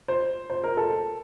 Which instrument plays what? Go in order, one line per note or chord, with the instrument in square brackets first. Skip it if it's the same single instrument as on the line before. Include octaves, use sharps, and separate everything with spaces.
[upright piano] C5
C5
A#4
A4